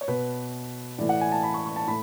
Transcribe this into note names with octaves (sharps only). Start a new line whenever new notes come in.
C#5
B2 B4
A2 E3 D5
F#5
G#5
A5
B5
C#6
C#6
A5
A2 B5